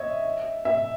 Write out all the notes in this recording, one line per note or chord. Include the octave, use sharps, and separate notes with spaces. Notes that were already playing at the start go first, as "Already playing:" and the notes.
Already playing: C#5 D#5 E5
E5